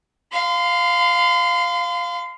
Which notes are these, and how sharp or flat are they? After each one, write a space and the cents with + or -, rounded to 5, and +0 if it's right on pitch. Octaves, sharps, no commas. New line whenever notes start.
F5 +0 C6 -40